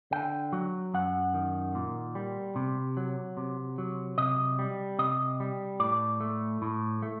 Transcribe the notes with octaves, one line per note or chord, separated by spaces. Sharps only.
D3 G5
F#3
F#2 F#5
D#3
A#2
G3
C3
F#3
C3
F#3
C3 D#5
G3
C3 D#5
G3
A2 D5
A3
A2
A3